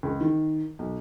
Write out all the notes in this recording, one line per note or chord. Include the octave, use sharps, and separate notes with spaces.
C#2
D#3
B1